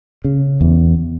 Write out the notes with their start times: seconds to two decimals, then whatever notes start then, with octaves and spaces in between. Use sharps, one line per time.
0.24 C#3
0.61 E2